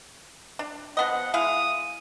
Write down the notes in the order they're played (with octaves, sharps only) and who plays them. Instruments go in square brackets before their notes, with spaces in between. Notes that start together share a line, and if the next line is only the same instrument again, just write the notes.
[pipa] D4
[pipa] F3 B3 D#5 [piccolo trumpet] F#5
[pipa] G#3 E4 F5 [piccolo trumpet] D#6